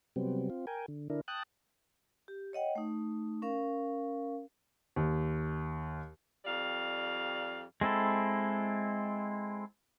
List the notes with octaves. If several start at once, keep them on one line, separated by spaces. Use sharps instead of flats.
C3 F#3 G3 B3 C4
C4 F4
A#4 G5 G#5
D3
D3 D4 E4 A#4
G5 A5 D#6 F#6
G4
C#5 D#5 F#5 G5
A3 D#4
C#4 A#4 F5
D#2
F2 G3 D5 F5
G#3 C4 E4 A4